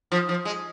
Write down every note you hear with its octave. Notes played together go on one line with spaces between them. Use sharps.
F3
F3
G#3